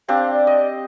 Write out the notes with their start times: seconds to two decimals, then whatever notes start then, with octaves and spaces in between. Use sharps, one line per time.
0.08 C4 D4 G4 F5
0.33 D5
0.47 D#5